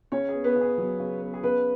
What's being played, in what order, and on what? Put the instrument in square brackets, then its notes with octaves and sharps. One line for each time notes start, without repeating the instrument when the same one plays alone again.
[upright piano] C#3 C#4 C#5
B3 G#4
B3 B4
C#3
G#4
F#3
C#3
B3
G#4
C#3 B3 B4